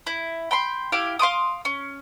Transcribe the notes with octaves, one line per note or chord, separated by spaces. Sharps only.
E4
G5 B5 C6
E4 G4 F5 D6
F5 C6 D6 D#6
C#4